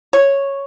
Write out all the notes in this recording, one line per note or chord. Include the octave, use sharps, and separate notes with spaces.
C#5